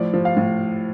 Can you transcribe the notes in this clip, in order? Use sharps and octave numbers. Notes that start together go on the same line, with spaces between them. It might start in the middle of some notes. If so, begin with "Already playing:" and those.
Already playing: A2 F3 D5
F3
F5
A2